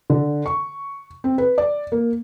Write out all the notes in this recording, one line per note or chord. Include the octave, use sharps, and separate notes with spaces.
D3
C#6
C4
B4
D5
A#3